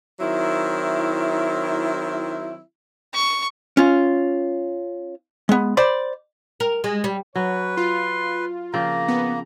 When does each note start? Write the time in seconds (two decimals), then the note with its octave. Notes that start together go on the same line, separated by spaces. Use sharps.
0.20 D#3 F#3 C4 E4
3.14 C#6
3.77 C#4 F4
5.49 G#3 B3
5.77 C5 D5 B5
6.60 A#4
6.84 G#3
7.04 G3
7.35 F#3 B4 C#5
7.77 F4 C6
8.74 C#3 F3 A#3 C4 A#5
9.08 B3